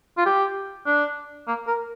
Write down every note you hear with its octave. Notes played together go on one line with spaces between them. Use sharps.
F4
G4
D4
A#3
A#4